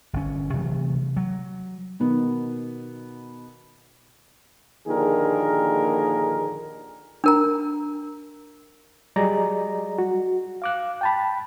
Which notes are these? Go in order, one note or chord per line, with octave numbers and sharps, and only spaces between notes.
G1 C#4
C3 E3 F#3 A3
F#3
B2 D#3 B3
A#1 D#2 D3 G#4 A#4
D4 A#4 A#5
F#3 G3 G#4 D5 D#5 A#5
F#4
F5 D6 F#6
G5 A5 B5